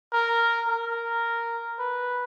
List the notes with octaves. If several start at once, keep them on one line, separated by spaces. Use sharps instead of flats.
A#4
A#4
B4